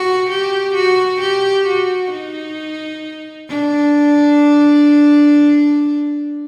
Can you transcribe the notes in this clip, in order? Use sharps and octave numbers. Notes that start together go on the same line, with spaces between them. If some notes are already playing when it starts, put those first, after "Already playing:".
Already playing: F#4
G4
F#4
G4
F#4
D#4
D4